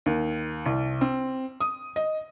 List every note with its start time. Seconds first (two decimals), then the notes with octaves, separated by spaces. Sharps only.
0.06 D#2
0.66 C2
1.01 C4
1.61 D#6
1.96 D#5